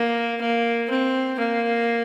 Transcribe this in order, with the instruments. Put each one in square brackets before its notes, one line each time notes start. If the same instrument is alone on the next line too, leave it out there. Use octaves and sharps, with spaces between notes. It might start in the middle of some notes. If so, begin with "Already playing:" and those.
Already playing: [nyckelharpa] A#3
A#3
C4
A#3